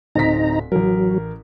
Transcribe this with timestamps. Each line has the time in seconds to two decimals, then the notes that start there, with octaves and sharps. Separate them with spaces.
0.16 D1 C4 D#4 A#5 B6
0.72 A1 F#3 A#4